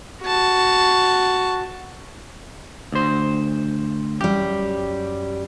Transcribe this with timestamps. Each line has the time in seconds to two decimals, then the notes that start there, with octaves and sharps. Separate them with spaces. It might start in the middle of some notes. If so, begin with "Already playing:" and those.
0.22 F#4 A5
2.92 D2 C5
4.21 F#2 G3 G4